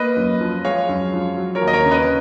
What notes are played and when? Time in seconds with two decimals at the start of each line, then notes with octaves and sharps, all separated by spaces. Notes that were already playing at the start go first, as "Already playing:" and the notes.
Already playing: A#3 B4 D#5
0.17 F#2
0.41 F3
0.65 G#3 C#5 F5
0.89 F#2
1.13 F3
1.37 F#3
1.55 A#4 C#5
1.61 D#2
1.68 D#5
1.73 A#4 C#5
1.85 C#3
1.91 B4 D#5